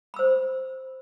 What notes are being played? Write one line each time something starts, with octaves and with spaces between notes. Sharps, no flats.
C5 B5 E6